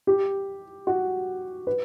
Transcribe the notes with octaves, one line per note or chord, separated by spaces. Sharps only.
G4
F#4
B4